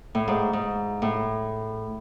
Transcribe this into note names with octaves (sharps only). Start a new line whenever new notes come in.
A2
G#2
G#2
A2